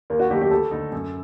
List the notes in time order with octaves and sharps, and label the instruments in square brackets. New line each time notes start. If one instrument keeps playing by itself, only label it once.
[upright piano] D#2 [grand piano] A#4
[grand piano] F#4
[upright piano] D#3 F#3 A3 D#4 [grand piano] G4
[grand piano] G4
[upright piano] D2 [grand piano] A4
[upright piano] D3 A3 D#4
F#2